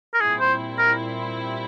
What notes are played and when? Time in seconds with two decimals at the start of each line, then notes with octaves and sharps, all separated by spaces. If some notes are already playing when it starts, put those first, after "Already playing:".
0.14 A#4
0.21 A#2 G3 C4 E4 G#4
0.40 C5
0.79 A#4